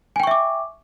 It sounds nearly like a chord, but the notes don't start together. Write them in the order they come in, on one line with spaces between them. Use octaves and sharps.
G#5 G5 C#6 E5 D6